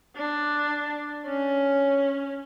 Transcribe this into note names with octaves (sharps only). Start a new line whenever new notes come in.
D4
C#4